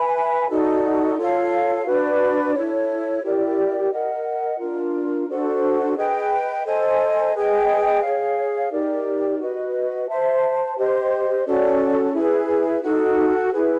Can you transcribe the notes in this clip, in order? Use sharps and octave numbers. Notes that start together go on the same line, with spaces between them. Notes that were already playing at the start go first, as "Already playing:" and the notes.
Already playing: B4 E5 G#5 B5
D#4 F#4 A4 D5
F4 A4 C#5 F5
D4 F#4 B4
E4 A4 C#5
E4 G4 A#4 D5
A#4 D#5 F#5
D4 F4 A#4
D4 F#4 A4 C5
G#4 B4 D#5 G5
A4 C5 D#5 G#5
G#4 B4 D#5 G5
G#4 C#5 F5
D#4 G4 A#4 D5
F#4 B4 D#5
C5 E5 A5
G4 C5 D#5
C#4 F#4 A4 D5
E4 G#4 B4
D#4 F#4 A4
E4 G#4 B4